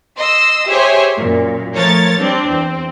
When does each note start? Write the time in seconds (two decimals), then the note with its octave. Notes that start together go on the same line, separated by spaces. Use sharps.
0.16 D#5 C6 E6
0.68 G4 G#4 C5 C#5 E5 G#5
1.16 F#2 A#2
1.74 F3 A3 A#4 C#5 A6
2.16 G3 C4 D4
2.46 E2 C4